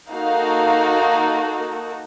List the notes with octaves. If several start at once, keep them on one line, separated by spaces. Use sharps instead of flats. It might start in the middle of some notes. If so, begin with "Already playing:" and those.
A#3 D#4 F#4 A4 F5